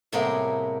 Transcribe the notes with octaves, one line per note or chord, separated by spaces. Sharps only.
A2 C3 G3 A#3 B3 G#4